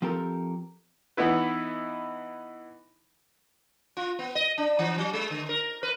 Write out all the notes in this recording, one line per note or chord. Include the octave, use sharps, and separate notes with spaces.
F3 C4 G4 A4 A#4
E3 B3 D#4 E4 B4
F4
B3
D#5
D4
E3
F#3
G#3
D3
A#4
B4